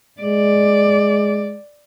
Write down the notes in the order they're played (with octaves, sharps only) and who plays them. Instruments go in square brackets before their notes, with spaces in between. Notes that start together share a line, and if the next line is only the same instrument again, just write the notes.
[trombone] G#3 [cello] D5